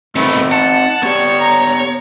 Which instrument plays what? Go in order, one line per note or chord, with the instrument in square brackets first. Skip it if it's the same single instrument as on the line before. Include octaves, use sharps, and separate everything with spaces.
[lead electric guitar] D#3 B3 [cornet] A3 [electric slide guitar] C4 D#4
[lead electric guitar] F#5 [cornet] A5
[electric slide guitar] B3 G4 D5 [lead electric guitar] C#5
[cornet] A#5